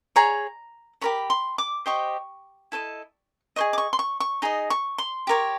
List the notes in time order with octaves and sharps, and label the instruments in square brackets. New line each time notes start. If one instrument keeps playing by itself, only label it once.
[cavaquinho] G#4 C#5 A#5
G4 A#4 C#5 B5
C6
D6
G4 C5 D#5 C#6
E4 A4 C5 D#5
G#4 C5 D#5 C#6
D6
C#6
C6
C#6
C#6
D#4 G#4 D#5
C#6
C6
G4 A#4 C#5